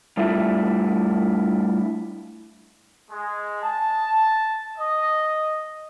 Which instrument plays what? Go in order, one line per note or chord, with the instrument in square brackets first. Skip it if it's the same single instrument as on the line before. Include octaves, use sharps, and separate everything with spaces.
[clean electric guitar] G3 A3 D4 E4 F4
[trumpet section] G#3
A5
D#5